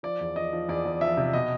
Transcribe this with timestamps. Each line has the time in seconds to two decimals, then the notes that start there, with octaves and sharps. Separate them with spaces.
0.03 F3 D5
0.20 E2
0.36 F3 D#5
0.53 F3
0.69 E2 D5
0.85 E2
1.01 F3 E5
1.17 C3
1.33 B2 D#5